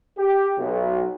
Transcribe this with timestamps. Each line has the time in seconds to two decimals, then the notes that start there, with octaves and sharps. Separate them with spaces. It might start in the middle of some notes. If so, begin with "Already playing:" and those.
0.17 G4
0.58 B1